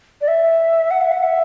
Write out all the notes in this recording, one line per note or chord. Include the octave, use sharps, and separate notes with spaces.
D5
E5
F#5
E5
F#5
E5